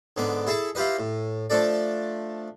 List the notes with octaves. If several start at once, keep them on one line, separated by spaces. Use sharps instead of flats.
G#2 D3 B3 D6
E4 G#4 A4 E5 A5
E4 F4 G4 B4 D#5
A2
F3 A3 D4 A4 D5